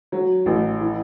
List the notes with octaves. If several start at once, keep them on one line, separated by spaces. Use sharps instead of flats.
F#3
A1
E3